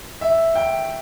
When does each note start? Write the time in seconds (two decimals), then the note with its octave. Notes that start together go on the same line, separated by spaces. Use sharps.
0.21 E5
0.55 G5